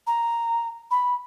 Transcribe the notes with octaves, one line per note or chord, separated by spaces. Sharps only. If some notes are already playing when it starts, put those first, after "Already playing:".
A#5
B5